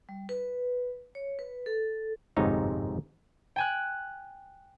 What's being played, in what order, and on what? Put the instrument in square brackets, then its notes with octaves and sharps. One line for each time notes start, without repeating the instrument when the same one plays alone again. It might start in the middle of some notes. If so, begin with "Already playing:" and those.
[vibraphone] G3
B4
C#5
B4
A4
[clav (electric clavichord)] G1 F2 G#2 C3 D#4 C#5
[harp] G5 G#5 F#6